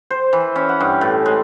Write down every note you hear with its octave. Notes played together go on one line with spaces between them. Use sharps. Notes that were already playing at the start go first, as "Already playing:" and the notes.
C5
E3
C#4
F#5
G2
A2
G#3